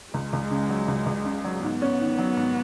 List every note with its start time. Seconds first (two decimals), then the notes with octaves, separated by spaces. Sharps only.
0.14 C#2 G#3
0.33 C#2
0.51 C#3
0.69 F#3
0.88 C#2
1.06 C#2
1.25 C#3
1.44 F#3
1.62 G#2 B3
1.82 C#4
2.00 D#3
2.19 F#3
2.37 G#2